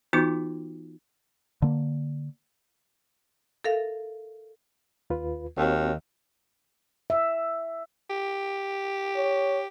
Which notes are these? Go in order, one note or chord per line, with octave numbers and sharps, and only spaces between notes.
E3 B3 D#4 F4 F#4 D6
D3 A#3
A4 A#4 E5 F5
D#2 F4 B4
D#2 C4 F#4 C#5
E5
G4
C#5